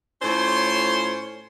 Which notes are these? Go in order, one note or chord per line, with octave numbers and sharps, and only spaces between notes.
A2 C#4 F4 C5 C#5 C6